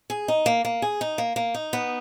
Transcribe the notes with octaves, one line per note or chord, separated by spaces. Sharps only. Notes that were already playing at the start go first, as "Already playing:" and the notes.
G#4
D#4
A#3
A#3
G#4
D#4
A#3
A#3
D#4
B3